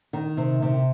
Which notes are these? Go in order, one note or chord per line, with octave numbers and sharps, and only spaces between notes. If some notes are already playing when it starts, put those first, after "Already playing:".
D#3
C3
C3